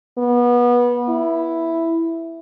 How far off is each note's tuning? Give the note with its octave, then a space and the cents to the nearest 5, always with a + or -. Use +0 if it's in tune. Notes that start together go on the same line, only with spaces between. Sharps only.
B3 -25
E4 +0